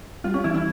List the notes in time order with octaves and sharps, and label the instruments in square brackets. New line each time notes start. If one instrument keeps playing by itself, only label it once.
[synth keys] G3 [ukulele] F4
[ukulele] C#4
[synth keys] E3 [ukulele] E4
[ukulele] E4